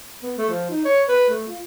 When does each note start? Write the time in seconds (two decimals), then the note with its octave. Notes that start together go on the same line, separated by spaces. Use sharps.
0.23 B3
0.38 A3
0.49 F3
0.70 D#4
0.85 C#5
1.09 B4
1.30 A3
1.48 F4